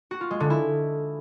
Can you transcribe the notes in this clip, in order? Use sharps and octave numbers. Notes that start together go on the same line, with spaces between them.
F#4
F4
G#3
D3
E4